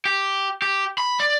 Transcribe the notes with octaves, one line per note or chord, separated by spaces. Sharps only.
G4
G4
B5
D5